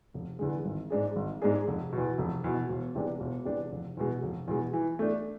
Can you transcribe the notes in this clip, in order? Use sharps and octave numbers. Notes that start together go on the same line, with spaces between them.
F1
E2 D3 G#3
G#1
G#2 G#3 D4 G#4
G#1
G#2 G#3 D4 G#4
F1
E2 B2
F1
E2 B2
E1
E2 C3 G#3 D4
E1
E2 C3 G#3 D4
F1
E2 B2 G#3
F1
E2 B2 G#3
E3
A3 D4